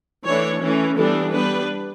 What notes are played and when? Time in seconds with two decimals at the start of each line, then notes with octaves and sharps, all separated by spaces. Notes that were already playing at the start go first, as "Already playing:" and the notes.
0.24 E3 A3 D4 C#5
0.60 E3 A3 C#4
0.96 E3 G3 B3 D4 A4
1.31 G3 B3 D4 B4